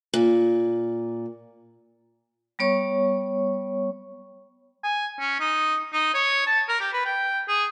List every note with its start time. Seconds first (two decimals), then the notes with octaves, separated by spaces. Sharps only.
0.14 A#2
2.59 G3 B3 C#5 C#6
4.84 G#5
5.20 C#4
5.40 D#4
5.93 D#4
6.14 C#5
6.47 A5
6.69 A#4
6.80 G4
6.93 B4
7.06 G5
7.48 G#4